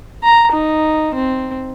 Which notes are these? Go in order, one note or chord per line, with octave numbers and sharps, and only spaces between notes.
A#5
D#4
C4